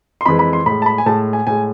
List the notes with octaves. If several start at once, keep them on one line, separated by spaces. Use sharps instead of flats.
C6
F2 E3 G#3 B5
B5
C6
A2 G#3 B5
A5
B5
G#5
A2 G#3 A5
G#5
A2 G#3 G#5